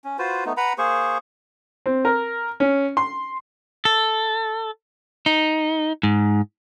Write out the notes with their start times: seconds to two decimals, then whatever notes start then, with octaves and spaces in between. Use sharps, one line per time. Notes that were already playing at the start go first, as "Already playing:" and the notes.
0.04 C#4
0.19 F4 F#4 B4 C5
0.45 A3 B3 D#4
0.57 B4 F#5 A#5 B5
0.78 A#3 G#4 C5 C#6
1.86 C4
2.05 A#4
2.60 C#4
2.97 C6
3.85 A4
5.26 D#4
6.03 G#2